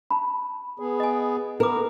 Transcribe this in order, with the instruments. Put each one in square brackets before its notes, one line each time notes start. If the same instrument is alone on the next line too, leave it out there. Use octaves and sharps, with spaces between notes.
[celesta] A5 B5
[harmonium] B3 G#4
[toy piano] D#5 G#5
[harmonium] B3 [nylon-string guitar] A#4 [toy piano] B4 D6